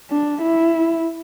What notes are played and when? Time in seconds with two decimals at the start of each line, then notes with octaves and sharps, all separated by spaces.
0.11 D4
0.42 E4